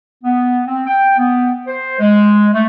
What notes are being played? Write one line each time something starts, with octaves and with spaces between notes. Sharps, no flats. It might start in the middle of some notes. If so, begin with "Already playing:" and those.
B3
C4
G5
B3
C5
G#3
A3